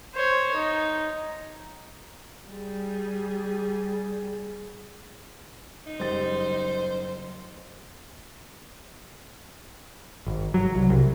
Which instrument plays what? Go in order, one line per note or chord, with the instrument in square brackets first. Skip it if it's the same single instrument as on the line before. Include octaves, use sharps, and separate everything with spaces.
[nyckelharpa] C5 C#5
D#4
[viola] G3 G#4
[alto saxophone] D#4
[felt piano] F#1 G3 A6 [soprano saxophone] C5
[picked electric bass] G#1
F#3
C2
C2